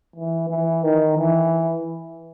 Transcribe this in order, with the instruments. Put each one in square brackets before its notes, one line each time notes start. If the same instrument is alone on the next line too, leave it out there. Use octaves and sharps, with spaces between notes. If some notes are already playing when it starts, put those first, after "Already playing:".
[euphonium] E3
E3
D#3
E3